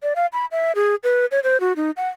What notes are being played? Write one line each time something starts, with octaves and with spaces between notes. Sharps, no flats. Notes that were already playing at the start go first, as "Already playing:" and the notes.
D5
F5
B5
E5
G#4
B4
C#5
C5
F#4
D#4
F#5